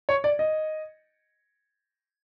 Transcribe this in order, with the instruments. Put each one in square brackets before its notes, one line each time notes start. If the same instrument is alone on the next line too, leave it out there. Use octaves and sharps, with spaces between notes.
[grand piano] C#5
D5
D#5